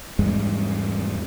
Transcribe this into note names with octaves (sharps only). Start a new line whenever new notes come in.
E2 G#2 G3 G#3